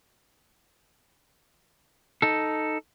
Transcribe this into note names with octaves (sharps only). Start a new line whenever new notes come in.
D#4 A4